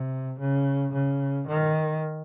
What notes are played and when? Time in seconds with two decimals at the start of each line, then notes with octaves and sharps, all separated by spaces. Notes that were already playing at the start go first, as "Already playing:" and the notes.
Already playing: C3
0.39 C#3
0.93 C#3
1.48 D#3